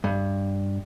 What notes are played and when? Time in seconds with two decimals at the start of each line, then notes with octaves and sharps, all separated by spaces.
0.04 G2